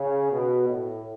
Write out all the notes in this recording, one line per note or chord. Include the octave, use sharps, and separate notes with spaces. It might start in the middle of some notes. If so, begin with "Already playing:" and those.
Already playing: C#3
B2
A2